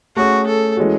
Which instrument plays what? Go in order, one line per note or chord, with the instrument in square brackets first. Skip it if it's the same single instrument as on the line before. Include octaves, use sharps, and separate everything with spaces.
[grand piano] A3 C#4 G#4 [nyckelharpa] F#4
[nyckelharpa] A4
[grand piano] E3 G#3 C#4 F#4